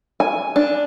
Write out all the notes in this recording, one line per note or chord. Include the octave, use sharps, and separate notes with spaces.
G#5
D4